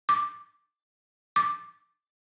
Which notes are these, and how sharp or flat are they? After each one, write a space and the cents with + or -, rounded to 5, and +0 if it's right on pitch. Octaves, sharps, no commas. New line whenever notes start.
D6 +5
D6 +5